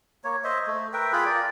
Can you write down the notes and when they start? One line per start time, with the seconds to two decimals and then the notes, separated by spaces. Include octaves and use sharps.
0.24 A#3 C#5
0.44 C5 D#5 E5
0.67 A3
0.93 A#4 B4 E5 G5
1.13 F4 G#4 G5 B5
1.26 A#4 D5